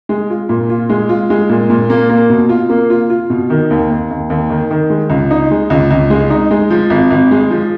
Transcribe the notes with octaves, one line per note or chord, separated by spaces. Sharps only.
G#3
F4
A#2
F4
G#3
F4
G#3
A#2
A#2
A#3
A#3
B2
F4
A#3
F4
F4
B2
D#3
D#2
D#2
D#2
D#2
D#3
D#3
G#3
C#2
D#4
G#3
C#2
C#2
G#3
D#4
G#3
F3
G#1
G#1
G#3
F3